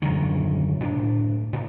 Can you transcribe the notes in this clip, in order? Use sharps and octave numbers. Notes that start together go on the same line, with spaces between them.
D#1 F#2 D3 D#3
A2 D4
A2